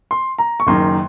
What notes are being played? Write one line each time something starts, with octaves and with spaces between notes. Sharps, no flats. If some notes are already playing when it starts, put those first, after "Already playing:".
C6
A#5
C#6
F#1 F#2 D#3 C6